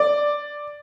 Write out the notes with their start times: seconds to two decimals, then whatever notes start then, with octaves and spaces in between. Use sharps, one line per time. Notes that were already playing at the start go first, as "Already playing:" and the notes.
Already playing: D5